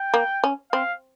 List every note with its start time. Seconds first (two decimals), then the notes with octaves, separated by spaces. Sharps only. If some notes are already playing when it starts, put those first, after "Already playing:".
Already playing: G5
0.14 A#3
0.44 C#4
0.72 C4 F5